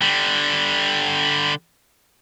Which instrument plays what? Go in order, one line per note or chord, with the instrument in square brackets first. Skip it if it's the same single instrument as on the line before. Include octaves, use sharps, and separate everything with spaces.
[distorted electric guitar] D3 G3